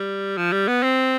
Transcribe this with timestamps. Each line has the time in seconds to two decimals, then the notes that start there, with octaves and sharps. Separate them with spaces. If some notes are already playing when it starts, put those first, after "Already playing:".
Already playing: G3
0.37 F3
0.53 G3
0.68 B3
0.83 C4